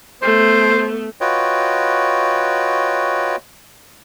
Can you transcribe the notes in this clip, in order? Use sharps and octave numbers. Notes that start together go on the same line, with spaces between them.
A3 B3 C5
F4 F#4 B4 C#5 D#5 G5